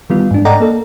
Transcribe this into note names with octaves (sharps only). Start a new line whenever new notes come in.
D#3 E3 G3 B3 F4
G#2 D4
A4 D5 D#5 F#5 G5 A#5
A#3 A4